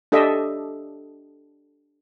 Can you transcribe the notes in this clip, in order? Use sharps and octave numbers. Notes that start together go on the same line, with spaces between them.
D4 G4 A4 D#5 E5